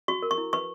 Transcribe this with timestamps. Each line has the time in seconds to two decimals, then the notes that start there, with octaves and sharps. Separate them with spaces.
0.08 F#4 C#6
0.22 A#4
0.31 C#6
0.38 E4
0.53 B4 C#6